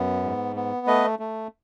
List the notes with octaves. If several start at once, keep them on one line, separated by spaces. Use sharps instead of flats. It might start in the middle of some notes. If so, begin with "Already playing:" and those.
Already playing: F#2 B3
G#2
B3
A3 B4 D#5
A3